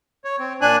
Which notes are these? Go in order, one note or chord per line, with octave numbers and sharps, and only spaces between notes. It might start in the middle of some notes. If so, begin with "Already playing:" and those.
C#5
C4
A#2 D4 G#5 F#6